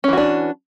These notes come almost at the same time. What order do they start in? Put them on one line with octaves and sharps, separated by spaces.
C#4 E3 F#4 D4